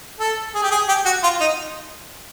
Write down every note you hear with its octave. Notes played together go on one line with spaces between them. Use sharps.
A4
G#4
G4
G#4
G4
F#4
F4
D#4